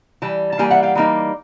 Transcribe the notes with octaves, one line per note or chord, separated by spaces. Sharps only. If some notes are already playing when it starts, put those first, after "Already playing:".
E3 G3 A5
A5
E3 G3 A#3 G#5
E5 F#5
F5 G5
E3 G3 A#3 D#4